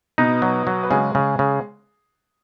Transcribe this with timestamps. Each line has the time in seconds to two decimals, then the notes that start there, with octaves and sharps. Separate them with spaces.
0.18 B2 B3 D#4
0.42 F#3
0.67 F#3
0.83 B4
0.90 C#3 G#3 G#4
1.15 C#3
1.39 C#3